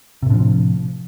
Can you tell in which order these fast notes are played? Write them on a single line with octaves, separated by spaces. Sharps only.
C3 A2 D4 F3